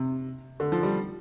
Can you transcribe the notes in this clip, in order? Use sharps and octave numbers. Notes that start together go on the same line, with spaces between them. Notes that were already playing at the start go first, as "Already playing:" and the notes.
Already playing: C3
D3
F3
G3